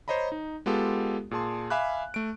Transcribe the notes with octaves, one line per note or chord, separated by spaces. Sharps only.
C5 C#5 D#5 A#5 B5
D#4
G#3 B3 F4 G4 A4
A#2 G#4 A5 C6
E5 F5 G#5 B5 D6 F#6
A3 D7